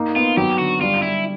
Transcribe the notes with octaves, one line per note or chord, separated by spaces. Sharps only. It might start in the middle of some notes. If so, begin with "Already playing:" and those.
Already playing: A#3 D#4
B3 F4
F#3 G4
D3 F#4
G3 F4
G3 E4